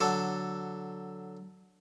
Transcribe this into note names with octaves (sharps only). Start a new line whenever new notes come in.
D3 F#3 A4